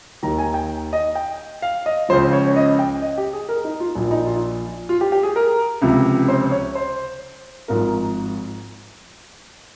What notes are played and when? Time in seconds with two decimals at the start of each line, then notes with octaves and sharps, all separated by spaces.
0.23 D#2 D#3 A#5
0.38 G#5
0.54 G5
0.93 D#5
1.15 G5
1.62 F5
1.86 D#5
2.09 C#2 C#3 F3 C5
2.33 C#5
2.48 C#5
2.56 D#5
2.79 G5
3.02 D#5
3.18 G4
3.33 G#4
3.49 A#4
3.65 D#4
3.80 F4
3.95 A#1 A#2 F3
4.11 D#4
4.27 F4
4.89 F4
5.01 G4
5.12 G4
5.23 G#4
5.36 A#4
5.82 C#2 C3 F3
6.28 C5
6.51 C#5
6.75 C5
7.68 G#1 G#2 F3 A#4